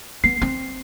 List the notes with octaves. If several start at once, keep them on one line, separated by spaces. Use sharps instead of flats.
B3 C7
C4